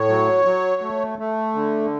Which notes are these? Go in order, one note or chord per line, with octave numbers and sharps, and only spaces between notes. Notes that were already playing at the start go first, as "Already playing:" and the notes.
Already playing: A2 C#5
F#3
F#3
A3
A3
D3